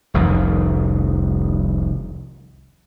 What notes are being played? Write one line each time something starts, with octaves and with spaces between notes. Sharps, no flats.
F1 C2 F2 D#3